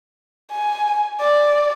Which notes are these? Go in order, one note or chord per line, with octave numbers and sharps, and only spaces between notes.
G#5
D5